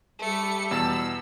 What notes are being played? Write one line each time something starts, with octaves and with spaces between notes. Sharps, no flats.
G3 A3 C#7
E2 B2 A5 E6